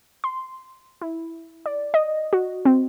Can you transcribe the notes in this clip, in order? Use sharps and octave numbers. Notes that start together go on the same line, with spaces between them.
C6
E4
D5
D#5
F#4
C4